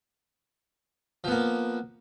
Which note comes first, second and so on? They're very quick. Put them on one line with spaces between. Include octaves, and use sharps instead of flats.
F3 B3 A#3